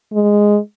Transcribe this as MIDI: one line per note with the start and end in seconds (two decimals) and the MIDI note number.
0.13 0.59 56